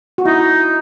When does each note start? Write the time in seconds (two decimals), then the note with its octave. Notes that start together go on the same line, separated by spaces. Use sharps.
0.18 F#4
0.25 D#4 E4